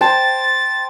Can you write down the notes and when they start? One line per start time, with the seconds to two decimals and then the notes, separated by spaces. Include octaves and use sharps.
0.01 C5 G5 A5 A6